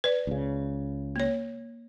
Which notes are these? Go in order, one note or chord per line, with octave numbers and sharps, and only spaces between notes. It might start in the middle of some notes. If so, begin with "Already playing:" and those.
B4 D5
C#2 C#3
A#3 C#5